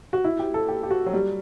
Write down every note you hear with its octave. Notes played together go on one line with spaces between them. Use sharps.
F#4
E4
G4
A4
G4
G4
F#4
F#3
G3